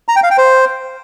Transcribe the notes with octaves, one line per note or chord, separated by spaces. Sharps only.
A#5
G5
F5
G5
C5